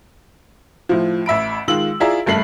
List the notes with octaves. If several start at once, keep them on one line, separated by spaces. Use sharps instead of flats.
A2 F3
A1 E5 B5 D7
D#3 G#3 F4 E6 F#7
E4 F4 G#4 D5 E5 A#5
F#1 G2 A3 C7 F#7